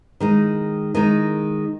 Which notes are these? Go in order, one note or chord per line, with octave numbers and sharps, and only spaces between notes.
D#3 G#3 D#4
D#3 G#3 D#4